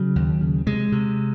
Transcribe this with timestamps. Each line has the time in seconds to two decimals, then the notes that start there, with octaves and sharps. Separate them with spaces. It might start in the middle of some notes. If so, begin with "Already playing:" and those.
Already playing: C#3 F#3
0.16 D#2
0.41 C#3
0.67 C3 G#3
0.92 C3